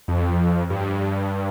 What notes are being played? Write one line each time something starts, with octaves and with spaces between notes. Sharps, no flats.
F2
G2